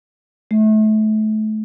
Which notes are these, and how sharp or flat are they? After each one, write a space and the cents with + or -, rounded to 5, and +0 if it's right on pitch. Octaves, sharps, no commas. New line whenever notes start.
A3 -30